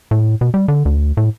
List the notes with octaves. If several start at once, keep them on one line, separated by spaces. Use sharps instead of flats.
A2
B2
G3
D3
D2
A2